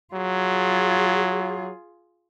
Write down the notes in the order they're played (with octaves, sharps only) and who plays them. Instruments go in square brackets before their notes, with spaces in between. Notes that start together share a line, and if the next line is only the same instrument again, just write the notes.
[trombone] F#3 [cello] F4 G#4